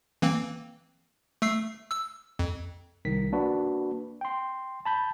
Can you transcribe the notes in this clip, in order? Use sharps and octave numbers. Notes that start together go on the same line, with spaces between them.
E3 A#3 C4
A3 E6 C7
E6
F2
C2 D#3 B6
A#3 D4 F#4 B4
G5 C6
A5 B5 G6